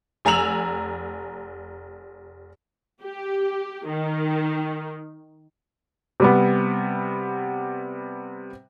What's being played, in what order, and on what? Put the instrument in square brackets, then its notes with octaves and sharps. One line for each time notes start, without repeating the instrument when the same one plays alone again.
[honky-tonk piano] F1 G#5 A#5 E6 F7 F#7
[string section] G4
D#3
[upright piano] C3 G3 B3